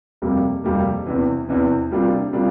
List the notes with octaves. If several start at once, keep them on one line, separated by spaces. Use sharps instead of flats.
F2 C3 G3 A#3
F2 C3 G3 A#3
E2 C3 E3
E2 C3 E3
C3 G3 A#3 D4 F4
C3 G3 A#3 D4 F4